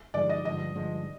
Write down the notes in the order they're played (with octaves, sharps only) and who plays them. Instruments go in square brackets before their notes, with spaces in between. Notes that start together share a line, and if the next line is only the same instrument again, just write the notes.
[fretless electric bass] G2 D3 F3 G#3 [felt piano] D5
[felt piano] D#5
[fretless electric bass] G2 D3 F3 G#3 [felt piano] D#5
[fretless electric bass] G2 D3 F3 G#3